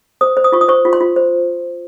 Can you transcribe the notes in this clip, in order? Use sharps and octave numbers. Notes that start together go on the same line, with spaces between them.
C5 D#6
C5
D#6
F4 C#6
D#6
C5 C#6
F4
C6
F4
C5